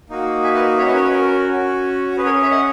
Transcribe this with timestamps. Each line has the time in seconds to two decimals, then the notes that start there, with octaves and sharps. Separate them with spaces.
0.09 A#3 D#4 F#4
0.44 E5 G#5
0.55 B4 D#5
0.77 C#4 F#4 C#5 E5
0.86 B4 D#5
0.95 A#4 C#5
1.04 B4
1.12 A#4
1.48 C#4 F#4
2.17 C#4 G#4 B4
2.25 A#4 C#5
2.42 C#5 E5
2.51 D#5 F#5